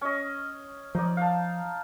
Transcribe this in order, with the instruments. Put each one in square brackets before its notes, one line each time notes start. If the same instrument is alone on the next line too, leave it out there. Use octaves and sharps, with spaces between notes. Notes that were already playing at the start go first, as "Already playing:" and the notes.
[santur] C#4 D#5
[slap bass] F3 [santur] D#4 D5
[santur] F5 A5